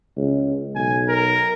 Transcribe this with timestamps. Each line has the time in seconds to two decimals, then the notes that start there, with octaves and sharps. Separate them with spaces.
0.17 C#2
0.75 B1 G#5
1.08 A#4